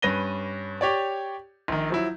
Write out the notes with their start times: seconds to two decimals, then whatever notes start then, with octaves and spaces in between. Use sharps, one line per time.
0.02 G2 C#4 B4 A#6 D#7 G7
0.81 G4 C#5 D5
1.68 A#1 D#3
1.90 F3 F#3 E4